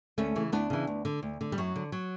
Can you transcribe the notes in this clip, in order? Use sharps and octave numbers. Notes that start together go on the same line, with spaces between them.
D2 A3 C#4
C#3 E3
D2 B3 D4
C#3 E3
D2
D3
D2
D3
G3
F#2 F#3
D3
F#3